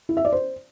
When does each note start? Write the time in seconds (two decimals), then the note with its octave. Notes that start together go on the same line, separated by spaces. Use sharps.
0.09 E4
0.17 E5
0.25 D5
0.33 C5